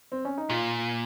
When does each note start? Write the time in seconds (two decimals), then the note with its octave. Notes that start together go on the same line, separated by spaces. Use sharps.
0.12 C4
0.25 C#4
0.38 D#4
0.50 A#2 F4